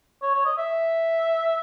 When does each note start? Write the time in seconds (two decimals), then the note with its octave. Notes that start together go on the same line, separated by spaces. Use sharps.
0.22 C#5
0.35 C#5
0.45 D#5
0.58 E5